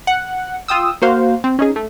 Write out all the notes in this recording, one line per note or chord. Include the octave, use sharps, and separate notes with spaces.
F#5
F4 G5 D#6 E6
A#3 F#4 C5 F5
C4
C#4 D#4 G#4
A3